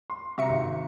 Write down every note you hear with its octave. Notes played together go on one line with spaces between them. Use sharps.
C6
C3 F#4 E5 A#5 C#7
G#1